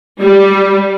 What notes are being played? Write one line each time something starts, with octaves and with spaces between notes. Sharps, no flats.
G3